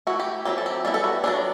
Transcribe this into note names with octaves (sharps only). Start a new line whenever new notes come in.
A3 E4 F#4
G4
F#3 C4 E4 G4
A4
G4
G3 B3 E4 G4
A4
F#4
F#3 B3 D4